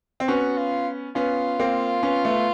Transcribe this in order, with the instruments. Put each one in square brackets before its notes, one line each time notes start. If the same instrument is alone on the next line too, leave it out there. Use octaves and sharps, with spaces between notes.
[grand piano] C4
[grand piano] B3 C#4 [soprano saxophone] F#4
[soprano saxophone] F4
[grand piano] B3 C#4 [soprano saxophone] F4
[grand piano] A#3 C4
B3 C#4
A3 B3
B3